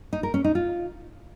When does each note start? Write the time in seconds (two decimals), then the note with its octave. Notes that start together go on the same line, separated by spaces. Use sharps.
0.13 D#4
0.23 A#4
0.34 C#4
0.44 D#4
0.55 F4